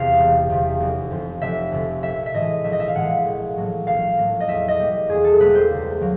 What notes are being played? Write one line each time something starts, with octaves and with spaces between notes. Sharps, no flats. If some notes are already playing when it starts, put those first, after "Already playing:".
Already playing: E2 C3 F5
E1
E2 C3
F1
F2 C3
F1 E5
F2 C3
A#1 E5
E5
A2 E3 G#3 D#5
A#1 E5
D#5
E5
F5
A2 E3 G#3 F#5
A#1
A2 F#3 A#3
A#1 F5
A2 F#3 A#3
D#5
E2 E5
D#5
B2 G3 A#3
E2 G#4
A4
B2 G3 A#3 B4
C5
C#2
F#3 A#3